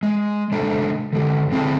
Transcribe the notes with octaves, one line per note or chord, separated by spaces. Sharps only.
G#3
C#3 G#3 A3 D4
D3 G#3 G4
D3 C4 E4 G#4 F5 A5